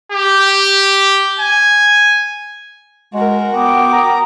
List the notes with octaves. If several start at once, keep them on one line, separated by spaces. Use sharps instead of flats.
G4
G#5
G#3 F#4 A#4
B3 G5 D6 D#6
A#5